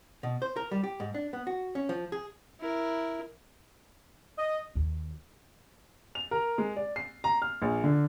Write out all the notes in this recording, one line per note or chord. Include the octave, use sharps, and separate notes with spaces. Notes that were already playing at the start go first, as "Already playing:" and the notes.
B2
C5
A#4
G3
G4
G#2
D4
B3
F#4
C#4
F3
G#4
E4 A#4
D#5
D#2
F7
A#4
G#3
D5
C7
A#5
F6
A#1
D3